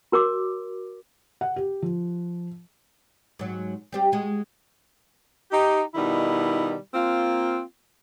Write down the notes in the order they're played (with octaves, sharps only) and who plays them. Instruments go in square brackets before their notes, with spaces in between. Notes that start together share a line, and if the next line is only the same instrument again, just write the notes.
[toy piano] F#4 A#4 C#5 D6
[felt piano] F#5
G4
F3
[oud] G#2 F#3
G3 C4 G4
G#3 F#4
[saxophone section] D#4 G4
B2 D#3 G3 D#4 E4
A#3 C4 F4